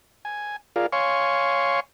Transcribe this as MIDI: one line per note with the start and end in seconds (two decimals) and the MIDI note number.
0.25 0.56 80
0.76 0.86 65
0.76 0.86 68
0.76 0.86 70
0.76 0.86 74
0.76 0.86 77
0.92 1.80 73
0.92 1.80 77
0.92 1.80 80
0.92 1.80 84
0.92 1.80 85